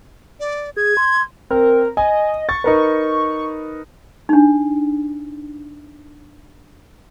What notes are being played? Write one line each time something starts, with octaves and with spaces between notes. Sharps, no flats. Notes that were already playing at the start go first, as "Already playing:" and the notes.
D5
G#4 G#6
C6
C4 A#4
D#5 G#5
C#6 A6
D#4 A#4 B4
D4 D#4